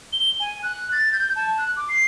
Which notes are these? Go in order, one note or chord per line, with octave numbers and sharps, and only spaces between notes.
G7
G#5
F#6
A6
G6
A5
F#6
D6
C7